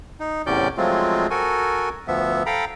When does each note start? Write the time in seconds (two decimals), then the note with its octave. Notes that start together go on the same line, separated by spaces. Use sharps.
0.20 D#4
0.46 E2 A2 C3 C#4 D5 G6
0.78 F3 F#3 G#3 A3 C4 F4
1.30 F#4 A4 A#4 G#5
2.08 D2 F3 B3 E5
2.46 A4 F5 G5 A#5 B5